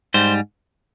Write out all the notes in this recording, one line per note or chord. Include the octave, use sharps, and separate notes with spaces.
G#2 G3 C5